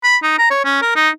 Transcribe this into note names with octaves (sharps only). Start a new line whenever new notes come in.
B5
D#4
A#5
C#5
C#4
A#4
D#4